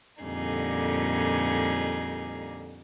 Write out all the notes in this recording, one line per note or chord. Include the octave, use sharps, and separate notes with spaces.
F2 A#2 D3 G3 D#4 G#4